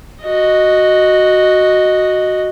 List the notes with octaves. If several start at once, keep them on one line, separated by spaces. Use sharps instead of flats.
F#4 D#5